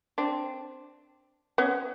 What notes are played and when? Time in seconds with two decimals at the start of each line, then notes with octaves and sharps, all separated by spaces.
0.18 C4 D4
1.58 B3 C#4